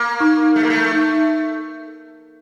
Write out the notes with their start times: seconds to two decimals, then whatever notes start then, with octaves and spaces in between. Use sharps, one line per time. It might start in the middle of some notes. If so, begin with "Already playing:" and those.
Already playing: A#3
0.20 D#4
0.56 A3
0.63 A#3
0.70 A3
0.92 D#4